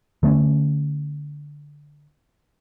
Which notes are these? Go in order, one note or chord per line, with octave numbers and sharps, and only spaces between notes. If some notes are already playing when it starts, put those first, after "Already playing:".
D3 A3 B3 C#4